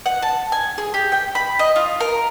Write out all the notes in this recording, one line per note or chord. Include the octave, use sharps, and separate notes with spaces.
F#5
A5
G#5
G#4
G4
G5
B5
D#5
F4
A#4